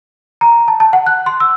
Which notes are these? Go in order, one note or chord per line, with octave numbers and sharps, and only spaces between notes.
A#5
A5
A5
F#5
F#6
C6
E6